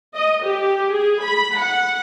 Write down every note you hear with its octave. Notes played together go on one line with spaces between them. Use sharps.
D#5
G4
G#4
B5
F#5